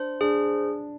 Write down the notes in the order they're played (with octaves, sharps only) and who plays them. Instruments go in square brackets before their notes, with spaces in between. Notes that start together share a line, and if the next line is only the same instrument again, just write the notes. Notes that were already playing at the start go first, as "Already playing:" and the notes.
Already playing: [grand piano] D4 [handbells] C5
[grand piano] D4 [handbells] G#4